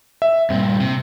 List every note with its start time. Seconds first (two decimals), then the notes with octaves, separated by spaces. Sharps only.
0.22 E5
0.50 G2 A#2 C4
0.80 C3